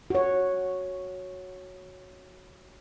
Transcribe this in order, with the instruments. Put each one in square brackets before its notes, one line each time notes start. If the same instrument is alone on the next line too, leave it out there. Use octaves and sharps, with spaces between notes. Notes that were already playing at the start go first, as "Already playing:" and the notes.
[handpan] F#4 C#5